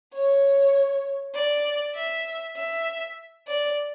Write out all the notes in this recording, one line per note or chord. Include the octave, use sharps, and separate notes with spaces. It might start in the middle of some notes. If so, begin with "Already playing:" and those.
C#5
D5
E5
E5
D5